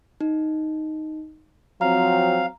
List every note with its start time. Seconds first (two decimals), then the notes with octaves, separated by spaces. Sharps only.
0.21 D#4
1.81 F3 F#3 C4 F5 A#5